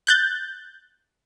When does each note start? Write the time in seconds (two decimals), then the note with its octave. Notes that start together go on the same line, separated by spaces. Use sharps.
0.07 F#6 G6 A6